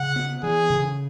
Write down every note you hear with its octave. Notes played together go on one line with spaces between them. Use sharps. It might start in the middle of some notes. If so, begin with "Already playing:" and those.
Already playing: C#3 F#5
B3
E3 G#4
C#3